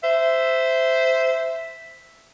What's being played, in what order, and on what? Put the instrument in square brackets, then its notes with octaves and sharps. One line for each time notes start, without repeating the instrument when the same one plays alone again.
[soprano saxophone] C5 [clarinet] E5